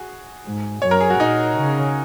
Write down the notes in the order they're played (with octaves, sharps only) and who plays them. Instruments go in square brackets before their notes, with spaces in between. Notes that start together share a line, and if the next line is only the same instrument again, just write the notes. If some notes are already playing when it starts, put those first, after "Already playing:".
Already playing: [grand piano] F#4 G#4
[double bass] G#2
[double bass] F#2 [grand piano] C#5
[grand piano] A#4
G#4
F#4
[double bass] A#2 [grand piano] D#4
[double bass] C#3